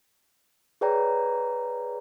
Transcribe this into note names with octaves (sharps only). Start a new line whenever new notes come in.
G#4 B4 C#5 D5 G5 A#5